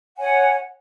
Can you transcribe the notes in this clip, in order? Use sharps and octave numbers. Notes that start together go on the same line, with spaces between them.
C#5 F#5 G#5